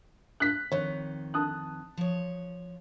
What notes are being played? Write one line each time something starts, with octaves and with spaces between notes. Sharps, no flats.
F#6 B6
F2 D#3 C#5
A5 D#6 F#6
F3 C#5